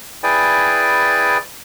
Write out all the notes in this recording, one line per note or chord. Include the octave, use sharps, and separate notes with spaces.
E4 G#4 B4 D5 G5 G#5